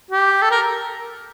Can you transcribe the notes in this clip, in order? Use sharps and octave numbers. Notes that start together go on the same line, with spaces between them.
G4
A4
A#4